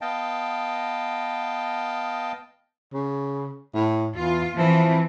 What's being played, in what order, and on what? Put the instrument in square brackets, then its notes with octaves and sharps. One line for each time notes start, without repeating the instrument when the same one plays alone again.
[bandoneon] B3 D#5 F5 G5 A5
[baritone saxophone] C#3
A2
[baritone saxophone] E2 [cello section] F4
[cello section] E3 C4 [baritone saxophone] F3